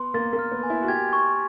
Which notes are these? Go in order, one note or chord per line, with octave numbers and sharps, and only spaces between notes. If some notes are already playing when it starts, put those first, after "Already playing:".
Already playing: B3 C6
A#3 A6
A#3
F6
B3
G#5
E4
F#4
G4 G#6
C#6